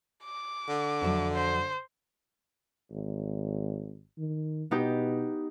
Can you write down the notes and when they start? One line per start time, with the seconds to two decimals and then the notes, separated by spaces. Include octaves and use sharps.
0.25 D6
0.68 D3
1.01 F2 F#3 E5
1.34 C5
2.91 G#1
4.18 D#3
4.71 B2 B3 D#4 G4